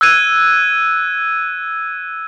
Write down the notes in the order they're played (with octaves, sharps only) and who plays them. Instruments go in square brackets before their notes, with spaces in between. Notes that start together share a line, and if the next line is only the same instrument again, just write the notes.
[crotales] E6 F#6 G#6 D#7